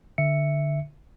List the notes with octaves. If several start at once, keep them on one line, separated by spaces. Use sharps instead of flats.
D3 E5 C#7